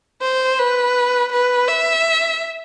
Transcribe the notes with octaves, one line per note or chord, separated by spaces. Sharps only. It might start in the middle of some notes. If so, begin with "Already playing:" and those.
C5
B4
B4
E5